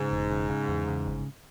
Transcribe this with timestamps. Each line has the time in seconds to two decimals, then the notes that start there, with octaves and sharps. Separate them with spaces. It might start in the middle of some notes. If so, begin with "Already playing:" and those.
Already playing: G#2 C#3
0.11 E1
0.31 C#3
0.49 C#3
0.69 E2
0.88 C#3
1.06 G1